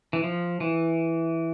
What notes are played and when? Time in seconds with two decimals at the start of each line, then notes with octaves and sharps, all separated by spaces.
0.13 E3
0.24 F3
0.60 E3